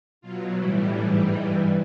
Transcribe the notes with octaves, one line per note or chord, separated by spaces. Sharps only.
B2 F#3 F4
A2 E3 G3 E4
G#2 E3 G3 D4
G2 E3 G3 D#4